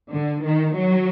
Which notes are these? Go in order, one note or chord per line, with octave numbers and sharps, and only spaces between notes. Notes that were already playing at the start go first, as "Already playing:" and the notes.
D3
D#3
F#3